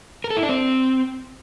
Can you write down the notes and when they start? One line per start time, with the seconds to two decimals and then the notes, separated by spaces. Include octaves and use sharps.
0.24 A#4
0.30 A4
0.37 E4
0.43 D4
0.49 C4